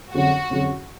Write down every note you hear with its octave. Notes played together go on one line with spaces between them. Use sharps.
F2 D3 F#3 C#4 F#4 G#4
F2 D3 F#3 C#4 G#4